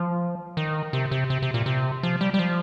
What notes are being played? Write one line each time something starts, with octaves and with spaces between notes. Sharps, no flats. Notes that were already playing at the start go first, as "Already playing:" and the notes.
Already playing: F3
D#3
C3
C3
C3
C3
A#2
C3
F3
G3
G3
F3